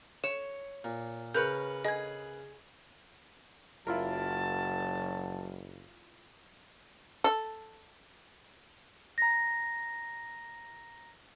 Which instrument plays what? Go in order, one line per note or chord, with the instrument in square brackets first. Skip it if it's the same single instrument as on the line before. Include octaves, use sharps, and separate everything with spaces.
[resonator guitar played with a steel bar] C#5 [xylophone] E7
[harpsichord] A#2
[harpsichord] C#3 [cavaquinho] A#4 B4 C#5 [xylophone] G6
[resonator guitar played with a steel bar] G#4 [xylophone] D#5 G#6
[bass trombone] F#1 [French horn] F#3 [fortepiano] E4 F4 A#4 [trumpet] A5
[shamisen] A4
[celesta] A#5 A#6